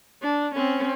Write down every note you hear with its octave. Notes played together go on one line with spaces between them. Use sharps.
D4
C4 C#4